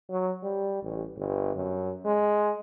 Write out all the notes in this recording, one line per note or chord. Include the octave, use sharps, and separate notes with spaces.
F#3
G3
A1
G1
F#2
G#3